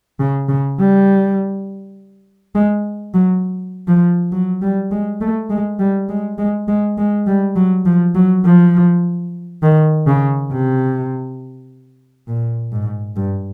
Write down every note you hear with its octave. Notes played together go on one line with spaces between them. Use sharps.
C#3
C#3
G3
G#3
F#3
F3
F#3
G3
G#3
A3
G#3
G3
G#3
G#3
G#3
G#3
G3
F#3
F3
F#3
F3
D#3
C#3
C3
A#2
G#2
G2